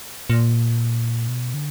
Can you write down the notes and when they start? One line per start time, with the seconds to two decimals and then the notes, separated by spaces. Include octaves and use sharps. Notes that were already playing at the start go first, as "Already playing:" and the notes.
0.30 A#2
1.28 B2
1.54 D3